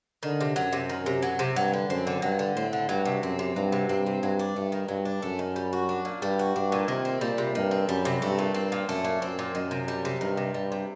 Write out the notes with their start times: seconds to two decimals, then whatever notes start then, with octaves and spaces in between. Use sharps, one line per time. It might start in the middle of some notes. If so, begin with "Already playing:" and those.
0.23 D3 D#3
0.40 C3
0.56 F#2 F#3
0.73 C3
0.90 D#3
1.06 C3
1.22 F#3
1.39 C3
1.56 G2 F#3
1.73 D3
1.89 F#2 C4
2.07 D3
2.22 G2 F#3
2.39 D3
2.56 A2 C4
2.73 D3
2.89 G2 F#3
3.05 C3
3.23 F#2 C4
3.39 C3
3.56 G2 F#3
3.72 C3
3.89 G2 C4
4.06 C3
4.22 G2 F#3
4.39 D4
4.56 G2 A3
4.72 D#3
4.88 G2 F#3
5.05 D4
5.22 F#2 A3
5.39 D#3
5.56 G3
5.73 F#4
5.89 D4
6.05 A#2
6.22 G2 G3
6.39 F#4
6.55 G2 D4
6.72 A#2
6.88 C3 D#3
7.05 C4
7.21 A#2 G3
7.38 C3
7.55 G2 D#3
7.71 C4
7.88 F#2 G3
8.05 C3
8.22 G2 A3
8.39 A#2
8.54 G2 C4
8.72 A#2
8.88 F#2 A3
9.04 A#2
9.22 F#2 C4
9.39 A#2
9.55 F#2 D#3
9.71 C3
9.88 G3
10.05 C3
10.21 G2 D#3
10.37 C3
10.54 G2 G3
10.72 C3